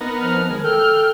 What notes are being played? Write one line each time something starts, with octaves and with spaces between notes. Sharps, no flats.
B3 D#4 A#4
F3 F6
D#3 G#3
A4 G5 F6